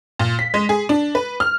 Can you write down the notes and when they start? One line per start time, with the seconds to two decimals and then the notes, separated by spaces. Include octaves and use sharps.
0.19 A#2
0.39 B6
0.54 G#3
0.69 G#4
0.89 D4
1.15 B4
1.40 F6